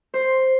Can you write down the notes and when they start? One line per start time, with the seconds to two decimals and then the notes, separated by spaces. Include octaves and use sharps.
0.14 C5